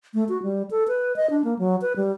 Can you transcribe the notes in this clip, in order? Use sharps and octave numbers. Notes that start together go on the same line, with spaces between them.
A3
F#4
G3
A4
B4
D#5
D4
A#3
F#3
B4
G3